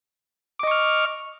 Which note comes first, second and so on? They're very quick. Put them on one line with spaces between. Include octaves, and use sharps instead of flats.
D6 D#5 C#6 F6